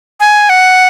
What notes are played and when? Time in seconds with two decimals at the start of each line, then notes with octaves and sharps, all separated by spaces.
0.20 G#5
0.49 F#5